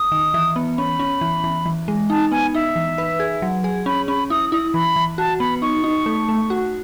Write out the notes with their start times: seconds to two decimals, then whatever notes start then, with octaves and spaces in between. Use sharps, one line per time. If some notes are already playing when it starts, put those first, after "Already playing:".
Already playing: D#6
0.12 D#3
0.34 E3
0.56 B3
0.78 C#4 B5
0.99 C#4
1.21 E3
1.44 E3
1.66 E3
1.88 G#3
2.10 D#4 A5
2.32 B3 G#5
2.54 D#4 E5
2.76 E3
2.98 B4
3.20 G#4
3.42 F#3
3.64 G#4
3.86 C#4 B5
4.08 C#4 B5
4.30 E4 D#6
4.52 E4 D#6
4.74 E3 B5
4.96 E3
5.18 F#4 A5
5.40 B3 B5
5.62 D#4 C#6
5.84 D#4
6.06 A3
6.29 A3
6.50 F#4